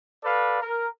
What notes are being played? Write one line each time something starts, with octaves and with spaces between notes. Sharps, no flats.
A4 B4 D5 F5
A#4